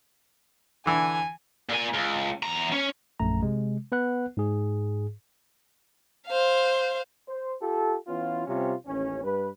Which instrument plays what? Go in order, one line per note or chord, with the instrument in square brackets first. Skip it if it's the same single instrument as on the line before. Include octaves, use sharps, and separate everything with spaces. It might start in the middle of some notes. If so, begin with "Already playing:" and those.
[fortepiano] D3 E3 [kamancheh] G#5
[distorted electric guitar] A#2 G#5
C#2
E2 A#5
C#4
[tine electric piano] A#1 F#2 A3 A#5
C3 G#3
B3 B4 F#5 F#6
G#2 G#4
[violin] C5 F5
[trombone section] C5
F4 G4 A4
E3 B3 C#4 F4
C3 G3 C4 C#4 F4
A1 D#2 C#4
G2 G3 B4